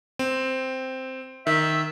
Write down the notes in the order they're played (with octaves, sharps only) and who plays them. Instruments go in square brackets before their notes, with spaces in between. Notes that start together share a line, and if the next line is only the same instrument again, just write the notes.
[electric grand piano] C4
[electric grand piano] D#3 [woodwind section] E5